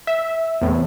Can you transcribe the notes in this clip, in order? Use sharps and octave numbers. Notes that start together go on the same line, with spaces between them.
E5
E2 A2 C3